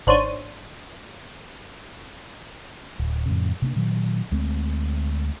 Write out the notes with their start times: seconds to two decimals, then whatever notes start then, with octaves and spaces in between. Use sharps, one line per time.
0.07 G#1 D4 C5 C#5 D#7
2.99 D1
3.26 F2 A2 C#3
3.62 C3 A#3 D4
3.76 A#2 D#3 F#3
4.31 D2 G#3 A3 C4